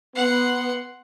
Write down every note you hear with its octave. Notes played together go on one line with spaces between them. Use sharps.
B3 F#5 C6